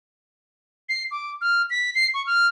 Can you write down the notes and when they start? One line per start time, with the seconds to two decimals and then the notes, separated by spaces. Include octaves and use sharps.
0.89 C7
1.11 D6
1.41 F6
1.70 B6
1.95 C7
2.14 C#6
2.27 F6